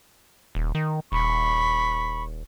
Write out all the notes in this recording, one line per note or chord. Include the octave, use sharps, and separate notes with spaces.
D#1
D#3
D#1 B5 C#6